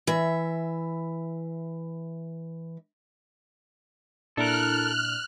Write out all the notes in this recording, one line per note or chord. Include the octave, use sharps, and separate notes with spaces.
E3 E5
A#2 D4 E4 A4 A#4 F6 F#6